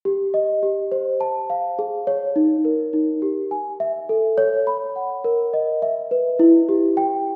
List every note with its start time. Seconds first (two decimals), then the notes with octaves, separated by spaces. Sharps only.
0.05 G4
0.34 D#5
0.63 G4
0.92 C5
1.21 A5
1.50 F5
1.79 G#4
2.07 C#5
2.36 D#4
2.65 A#4
2.93 D#4
3.22 G4
3.51 G#5
3.80 E5
4.09 A4
4.38 C#5
4.67 B5
4.96 F#5
5.24 A#4
5.53 D#5
5.82 E5
6.11 B4
6.39 E4
6.69 G4
6.97 G5